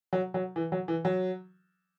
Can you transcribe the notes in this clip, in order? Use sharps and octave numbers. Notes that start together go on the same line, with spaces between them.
F#3
F#3
E3
F#3
E3
F#3